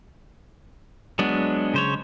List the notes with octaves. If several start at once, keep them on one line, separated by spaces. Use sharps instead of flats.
F#3 G#3 B3 D4
C#3 C5 C#5